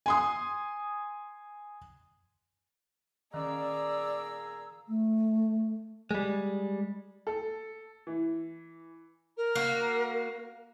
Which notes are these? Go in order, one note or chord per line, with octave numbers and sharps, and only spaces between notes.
G#5 C6 D#6
A#2 D#3 C#4 G#4 D5 F5 A#5 E6
A3
G3 G#3
A4
E3
A#4
A#3 F#4